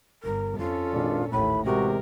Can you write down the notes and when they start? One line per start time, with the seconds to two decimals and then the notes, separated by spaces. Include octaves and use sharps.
0.23 G1 A#4
0.58 F2 C#4 F4 A4
0.92 G#1 A#2 D4
1.32 A1 D#2 A2 B5
1.65 E2 C3 G#3 F#4 G4 A#4